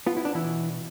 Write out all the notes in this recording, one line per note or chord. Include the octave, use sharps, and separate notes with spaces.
B3 F4
E4
D4
E3 E4
B2